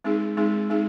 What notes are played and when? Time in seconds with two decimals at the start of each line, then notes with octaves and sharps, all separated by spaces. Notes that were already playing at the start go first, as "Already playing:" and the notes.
0.04 G#3 C4 D#4 G#4
0.37 G#3 C4 D#4 G#4
0.70 G#3 C4 D#4 G#4